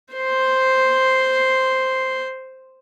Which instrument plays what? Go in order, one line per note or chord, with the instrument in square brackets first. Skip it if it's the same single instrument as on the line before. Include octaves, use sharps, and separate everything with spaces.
[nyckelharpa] C5 C6